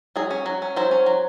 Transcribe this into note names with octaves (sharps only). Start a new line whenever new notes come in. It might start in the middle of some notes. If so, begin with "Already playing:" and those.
F#3 G#4
C#4
F#3
C#4
F#3 C5
C#4
F#3